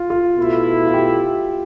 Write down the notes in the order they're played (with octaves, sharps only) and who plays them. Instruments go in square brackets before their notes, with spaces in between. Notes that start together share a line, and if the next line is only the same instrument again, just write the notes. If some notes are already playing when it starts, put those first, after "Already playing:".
Already playing: [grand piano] F4
F4
[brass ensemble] B2 A3 E4
[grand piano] F4
G4